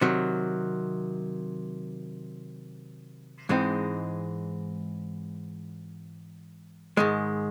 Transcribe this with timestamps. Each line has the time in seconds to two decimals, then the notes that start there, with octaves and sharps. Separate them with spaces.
0.01 C3 D#3 F#3
3.49 G#2 E3 G#3 C4 D#4
6.97 G#2 D#3 G#3